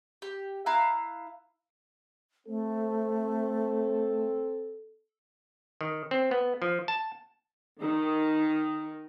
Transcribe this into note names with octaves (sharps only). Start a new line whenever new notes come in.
G4
E4 F5 A#5 F#6
A3 C4 A4
D#3
C4
B3
F3
A5
D#3